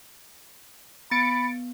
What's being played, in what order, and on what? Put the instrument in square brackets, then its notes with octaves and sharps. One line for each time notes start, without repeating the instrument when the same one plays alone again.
[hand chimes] B3 [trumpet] B5 [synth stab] A6 C#7 D7